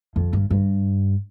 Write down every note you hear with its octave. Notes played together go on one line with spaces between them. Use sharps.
F2
G2
G2